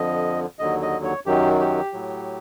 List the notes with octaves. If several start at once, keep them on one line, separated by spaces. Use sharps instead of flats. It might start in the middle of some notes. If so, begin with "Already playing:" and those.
Already playing: F2 D3 F3 D#5
D#2 D3 F#3 D#5
D#5
C#5
F#2 D#3 F#3 G4
G4
A2 F#3